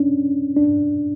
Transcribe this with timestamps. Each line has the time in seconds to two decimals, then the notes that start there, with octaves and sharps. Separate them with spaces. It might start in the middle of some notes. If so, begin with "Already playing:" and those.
Already playing: C#4 D4
0.57 D4